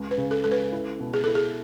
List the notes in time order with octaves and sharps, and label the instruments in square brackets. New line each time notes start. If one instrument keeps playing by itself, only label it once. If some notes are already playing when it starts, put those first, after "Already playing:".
Already playing: [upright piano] C#2
[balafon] B4
[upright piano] C#3
[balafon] A4
[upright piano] C#2 [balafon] A4
[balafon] B4
[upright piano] E4
B2
[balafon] G#4
[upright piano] E4 [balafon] A4
[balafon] G#4